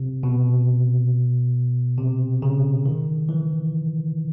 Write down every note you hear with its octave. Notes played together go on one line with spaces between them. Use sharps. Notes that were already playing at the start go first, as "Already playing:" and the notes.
Already playing: C3
B2
C3
C#3
D#3
E3